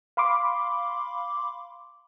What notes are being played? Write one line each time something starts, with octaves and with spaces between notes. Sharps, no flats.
F5 B5 C6 D6